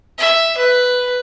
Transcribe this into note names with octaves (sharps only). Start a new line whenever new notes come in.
E5
B4